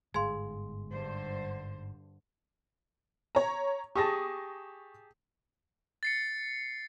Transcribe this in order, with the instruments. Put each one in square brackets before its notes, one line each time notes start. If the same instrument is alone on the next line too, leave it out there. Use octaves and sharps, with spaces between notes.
[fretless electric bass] G1 G#2 [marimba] G#4 F5 [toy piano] G#5 C6
[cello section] G2 D3 C5
[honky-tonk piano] C#5 A#5
[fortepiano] G4 G#4 A5 [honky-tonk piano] C#6 D#6 A#6
[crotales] A6 C7 C#7